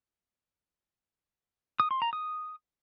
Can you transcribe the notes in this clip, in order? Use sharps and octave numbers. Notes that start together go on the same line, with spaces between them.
D#6
C6
A#5
D#6